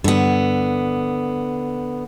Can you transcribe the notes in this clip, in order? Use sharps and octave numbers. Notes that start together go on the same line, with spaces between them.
G2 D3 B3